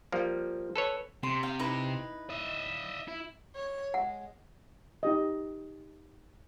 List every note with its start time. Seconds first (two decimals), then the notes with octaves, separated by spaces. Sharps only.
0.12 F3 G3 A#3
0.76 A4 B4 C#5
1.23 C3 C6
1.43 F5 G5
1.59 D#4 E4 B4
2.30 D#5 E5
3.08 E4
3.56 C#5
3.94 G#3 F#5
5.03 D#4 G4 D#5